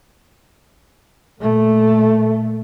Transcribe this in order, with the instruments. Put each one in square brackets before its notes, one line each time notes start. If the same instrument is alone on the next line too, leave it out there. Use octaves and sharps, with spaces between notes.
[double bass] A#2 A3